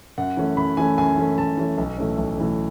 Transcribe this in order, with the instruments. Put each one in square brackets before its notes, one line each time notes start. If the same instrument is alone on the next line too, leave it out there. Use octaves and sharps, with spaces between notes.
[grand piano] F#2 F#5
E3 A3 C#4
F#2 B5
E3 A3 C#4 G#5
F#2 G#5
E3 A3 C#4
F#2 A5
E3 A3 C#4
B1
A2 E3 A3 C#4
B1
A2 E3 A3 C#4